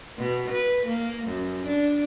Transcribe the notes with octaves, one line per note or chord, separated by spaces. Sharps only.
B2
B4
A#3
F#2
D4